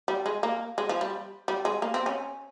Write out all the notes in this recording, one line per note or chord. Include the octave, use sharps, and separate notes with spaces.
G3
G#3
A#3
G#3
F3
G3
G3
G#3
A#3
C4
C#4